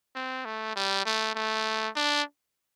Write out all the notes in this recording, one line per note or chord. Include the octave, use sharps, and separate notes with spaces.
C4
A3
G3
A3
A3
D4